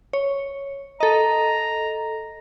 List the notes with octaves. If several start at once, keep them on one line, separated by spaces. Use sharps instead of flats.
C#5
A4 D#5 A#5